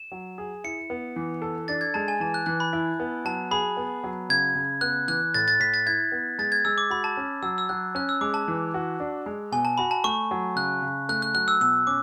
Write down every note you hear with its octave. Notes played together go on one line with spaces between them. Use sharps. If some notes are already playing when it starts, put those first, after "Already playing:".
Already playing: E7
F#3
G#4
E4 C#7
B3
E3
A4
D4 A6
G#6
G#3 A5
G#5
E3 A5
F#6
E3 F#6
B5
E4
B3
F#3 A5
G#4 B5
B3
F#3
C#3 G#6
C#3
B3 F#6
E3 F#6
A2 A6
A6
A2 B6
A6
E4 G#6
B3
G#3 A6
G#6
G#3 E6
D6
F#4 B5
A5
C#4
F#3 E6
E6
F#3 F#6
C#4 F#6
E6
G#3 D6
A5
E3
F#4
D4
G#3
B2 G#5
A5
F#4 B5
A5
A3 C#6
F#3
C#3 F#6
C#3
A3 F#6
F#6
F#3 F#6
E6
B2 E6
C#4 D6